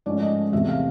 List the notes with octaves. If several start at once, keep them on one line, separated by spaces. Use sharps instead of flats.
G#2 F3 A3 C#4 D5
D#5
E2 C3 E3 A3 E5
F5